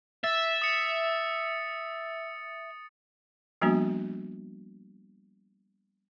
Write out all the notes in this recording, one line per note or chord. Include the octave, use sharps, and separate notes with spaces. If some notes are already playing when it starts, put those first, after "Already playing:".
E5 A6
D#6 C#7
F3 G3 A#3 B3 D4 F#4